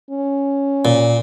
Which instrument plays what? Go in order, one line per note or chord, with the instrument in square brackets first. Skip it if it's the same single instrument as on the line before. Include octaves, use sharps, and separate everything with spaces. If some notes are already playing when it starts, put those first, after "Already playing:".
[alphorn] C#4
[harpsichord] A#2